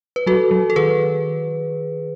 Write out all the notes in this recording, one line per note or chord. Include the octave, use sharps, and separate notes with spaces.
B4
F#3 F#4 A4
F#3
A4
D#3 G#4 B4